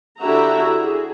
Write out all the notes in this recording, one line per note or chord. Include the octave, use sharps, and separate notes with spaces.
D3 E4 F#4 G4 E5 A#5
G#4